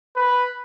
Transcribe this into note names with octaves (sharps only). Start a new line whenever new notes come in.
B4